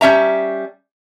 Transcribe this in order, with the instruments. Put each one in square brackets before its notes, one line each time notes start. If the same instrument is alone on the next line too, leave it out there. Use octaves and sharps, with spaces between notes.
[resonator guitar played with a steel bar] G3 C#4 E5 A#5